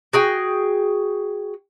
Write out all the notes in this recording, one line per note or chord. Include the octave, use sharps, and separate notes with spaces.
F#4 G#4 G5